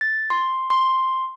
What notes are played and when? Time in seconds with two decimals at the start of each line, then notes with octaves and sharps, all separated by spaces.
0.01 A6
0.30 C6
0.70 C6